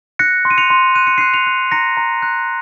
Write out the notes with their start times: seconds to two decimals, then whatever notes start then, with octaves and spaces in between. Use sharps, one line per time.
0.19 F#6 A#6 C#7
0.45 C6
0.51 D#7
0.58 C#7 F7
0.70 C6
0.95 F#6 D#7
1.07 C#7
1.18 F#6 C7 D#7
1.33 C#7 F7
1.47 F#6
1.72 A#5 A#6 C#7
1.97 A#5
2.22 F#6